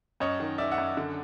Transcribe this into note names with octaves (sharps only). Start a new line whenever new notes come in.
F#2 C#5 D#5
D#3
D#3 D5 E5
E5 F#5
F#2
D3